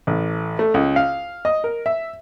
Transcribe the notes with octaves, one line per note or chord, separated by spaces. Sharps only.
A1
A3
C#2
F5
D#5
A#4
E5